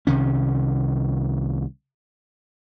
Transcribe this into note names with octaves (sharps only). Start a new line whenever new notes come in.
C2 C3 D#3 C#4